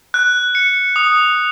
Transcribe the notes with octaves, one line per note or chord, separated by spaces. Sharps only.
F#6
C#7
D#6